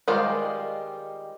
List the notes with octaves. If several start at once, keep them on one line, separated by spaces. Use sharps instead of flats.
D#3 G3 G#3 F4 C5